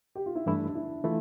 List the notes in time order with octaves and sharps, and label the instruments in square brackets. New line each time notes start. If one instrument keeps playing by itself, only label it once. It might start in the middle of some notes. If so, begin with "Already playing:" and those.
[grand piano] G4
F4
E4
[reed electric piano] G2 E3 A3 E4 [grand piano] D4
[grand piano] D4
E4
[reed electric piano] E3 A3 E4 [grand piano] F4